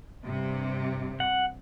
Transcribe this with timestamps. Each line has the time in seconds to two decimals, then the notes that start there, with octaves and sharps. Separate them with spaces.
0.23 G2 C3
1.20 F#5